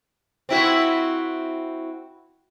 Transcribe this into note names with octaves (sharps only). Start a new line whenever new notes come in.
C4 E4 F#4